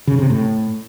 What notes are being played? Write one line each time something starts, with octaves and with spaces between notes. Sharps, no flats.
C#3
C3
A2